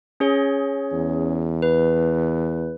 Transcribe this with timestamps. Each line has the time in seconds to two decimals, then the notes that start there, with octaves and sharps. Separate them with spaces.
0.20 C#4 G#4 C#5
0.92 E2
1.62 B4